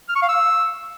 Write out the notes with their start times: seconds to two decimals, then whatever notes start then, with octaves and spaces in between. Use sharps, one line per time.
0.09 F6
0.16 C#6
0.22 F5
0.29 E6